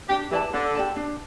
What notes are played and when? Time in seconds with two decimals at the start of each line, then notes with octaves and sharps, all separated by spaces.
0.09 D4 G4
0.31 E3 G4 D5 A5
0.53 D3 D4
0.75 G4 D5 A5
0.96 D4